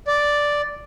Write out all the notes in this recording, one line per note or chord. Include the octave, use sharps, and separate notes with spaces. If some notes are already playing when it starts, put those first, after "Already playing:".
D5